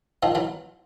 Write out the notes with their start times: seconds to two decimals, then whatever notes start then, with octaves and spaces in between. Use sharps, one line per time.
0.23 D#3 F3
0.35 E3 F#3